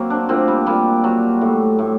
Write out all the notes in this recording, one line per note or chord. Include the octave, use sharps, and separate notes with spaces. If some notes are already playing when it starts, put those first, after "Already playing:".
Already playing: F#3 A#3 C4
D4
A#2 C4
G3
A#2 G3
F#3
A2
A2